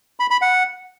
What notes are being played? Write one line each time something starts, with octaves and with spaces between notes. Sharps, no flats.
B5
B5
F#5